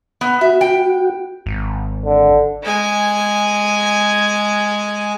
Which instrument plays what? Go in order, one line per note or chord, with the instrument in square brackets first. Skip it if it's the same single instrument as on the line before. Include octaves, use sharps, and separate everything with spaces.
[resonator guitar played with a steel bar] B3
[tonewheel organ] F#4 [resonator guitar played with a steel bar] E5
[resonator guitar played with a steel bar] G5
[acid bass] G#1
[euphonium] D3
[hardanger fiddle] G#3 G#5